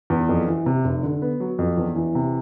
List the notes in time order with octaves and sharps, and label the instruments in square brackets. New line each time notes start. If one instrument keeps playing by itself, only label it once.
[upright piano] E2
F2
E3
C3
F1
D3
B3
F#3
F2
E2
E3
C3